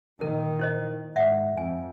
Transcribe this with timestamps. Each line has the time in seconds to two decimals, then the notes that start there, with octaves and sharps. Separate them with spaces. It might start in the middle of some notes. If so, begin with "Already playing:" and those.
0.21 A#2 D#3 A#4
0.59 E4 C5 D#5
1.16 G#2 E5 F#5
1.57 F2 G#5